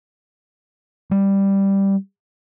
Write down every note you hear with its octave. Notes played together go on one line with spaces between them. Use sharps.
G3